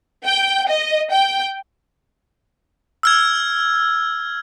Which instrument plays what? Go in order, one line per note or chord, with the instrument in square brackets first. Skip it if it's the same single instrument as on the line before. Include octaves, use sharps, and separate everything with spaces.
[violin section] G5
D#5
G5
[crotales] E6 F6 G#6